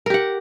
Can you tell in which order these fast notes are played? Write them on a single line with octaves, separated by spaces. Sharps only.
A#4 G4 F#5